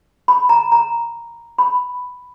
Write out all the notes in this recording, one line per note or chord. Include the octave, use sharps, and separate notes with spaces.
B5
A#5
A#5
B5